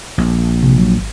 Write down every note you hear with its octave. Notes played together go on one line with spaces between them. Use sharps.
A#1
C3
F#3
G#1